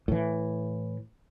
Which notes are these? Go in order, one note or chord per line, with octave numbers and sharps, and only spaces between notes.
A2 E3